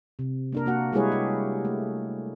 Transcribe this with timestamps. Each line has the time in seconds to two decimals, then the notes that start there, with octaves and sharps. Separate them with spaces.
0.19 C3
0.53 A#3 D4 A#4
0.66 A#3 F#4 F#5
0.93 G3 G#3 E4 G#4 B4 C#5
1.12 G4
1.65 A3